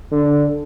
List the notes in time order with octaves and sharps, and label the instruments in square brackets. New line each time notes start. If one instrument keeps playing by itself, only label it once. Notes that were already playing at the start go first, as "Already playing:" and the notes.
[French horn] D3